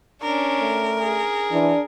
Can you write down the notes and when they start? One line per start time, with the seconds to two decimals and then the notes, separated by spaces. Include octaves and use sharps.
0.22 C#4 D4 A#4
0.60 A3
1.01 G#4
1.52 E3 D4